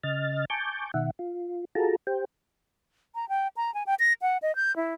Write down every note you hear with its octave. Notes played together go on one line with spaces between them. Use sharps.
C#3 D#5 F6 A6
G#5 A5 C#6 D6 G6
B2 D#3 E5 F#5
F4
F4 F#4 G#4 A4 A5 A#5
G4 C5 G5
A#5
G5
A#5
G#5
G5
A#6
F#5
D#5
G6
E4